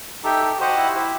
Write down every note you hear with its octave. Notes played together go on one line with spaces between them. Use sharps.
D#4 G4 A4 E5 G5
G4
F#4 G4 C5 D#5 F#5
E4
E4 G4 C5 E5